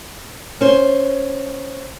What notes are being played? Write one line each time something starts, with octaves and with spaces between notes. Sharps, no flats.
C#4 C5